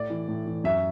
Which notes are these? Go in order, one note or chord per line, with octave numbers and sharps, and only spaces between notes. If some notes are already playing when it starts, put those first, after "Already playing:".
Already playing: A2 D5
E3
A2
E3
F#2 E5